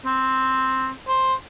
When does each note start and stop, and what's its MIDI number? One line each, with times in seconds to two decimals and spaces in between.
0.06 0.89 60
1.08 1.34 72